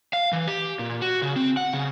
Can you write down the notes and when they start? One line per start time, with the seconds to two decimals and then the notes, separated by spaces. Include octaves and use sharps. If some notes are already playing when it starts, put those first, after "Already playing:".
0.13 F5
0.33 E3
0.48 G4
0.79 A#2
1.02 F#4
1.22 C#3
1.36 C4
1.57 F#5
1.73 C#3